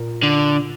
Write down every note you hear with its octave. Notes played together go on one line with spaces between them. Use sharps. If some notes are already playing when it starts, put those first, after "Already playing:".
Already playing: A#2
D3